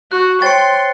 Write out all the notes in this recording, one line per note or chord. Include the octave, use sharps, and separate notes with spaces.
F#4 F#6
C5 C#5 G5 C6 A6 C#7